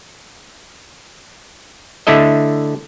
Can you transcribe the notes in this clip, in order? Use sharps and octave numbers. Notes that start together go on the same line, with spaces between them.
D3 A3 E4 A4 D#5